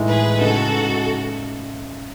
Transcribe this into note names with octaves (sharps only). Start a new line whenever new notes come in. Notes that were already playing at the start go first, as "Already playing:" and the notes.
Already playing: A2 E3 G#3 D#4
G#4 B4
C#3 G#3 D#4 F#4 A4